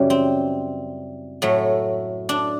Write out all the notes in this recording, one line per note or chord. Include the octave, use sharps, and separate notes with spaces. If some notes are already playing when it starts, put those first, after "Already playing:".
Already playing: F#2 C#3 E3 G3
C4
A2 F#3 A3
D4